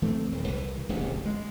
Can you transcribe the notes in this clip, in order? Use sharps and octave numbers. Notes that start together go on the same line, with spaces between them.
E3 A3 A#3 C4
D#1 E2
C2 E3
D1 A1 F2 B2
G#3